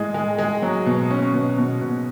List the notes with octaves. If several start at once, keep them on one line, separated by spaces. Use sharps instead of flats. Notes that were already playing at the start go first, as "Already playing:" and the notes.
Already playing: A2 G#3
G#3
G#3
F#3
B2
C#4
B2
B2
B2